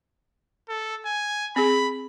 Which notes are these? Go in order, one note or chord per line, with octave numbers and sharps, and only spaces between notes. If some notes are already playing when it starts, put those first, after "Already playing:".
A4
G#5
C4 G#4 B5